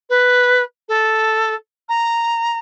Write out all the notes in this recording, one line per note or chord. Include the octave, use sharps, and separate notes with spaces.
B4
A4
A#5